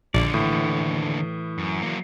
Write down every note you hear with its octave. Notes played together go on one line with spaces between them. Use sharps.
A#1 D#2 D3 D5
A2 E3
F#2
F#3 A#3